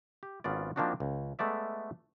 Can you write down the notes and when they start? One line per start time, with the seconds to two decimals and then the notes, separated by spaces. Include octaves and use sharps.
0.23 G4
0.44 G#1 B3 C#4 F4 D5
0.76 F3 A#3 C4 D4 D#4 F#4
1.00 C#2
1.39 G#3 A3 B3 D5 E5